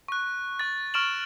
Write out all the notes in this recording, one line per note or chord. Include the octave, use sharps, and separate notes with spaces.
C#6 F#6
C#6 A6
C#6 F6 D7 E7 F#7